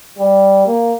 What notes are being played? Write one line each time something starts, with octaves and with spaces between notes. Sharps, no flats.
G3
A#3